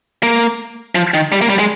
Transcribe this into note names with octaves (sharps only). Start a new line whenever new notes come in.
A#3
F3
D#3
G3
A#3
G3
G#3